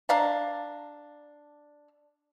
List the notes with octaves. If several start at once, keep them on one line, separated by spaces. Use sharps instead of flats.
D4 F5 A#5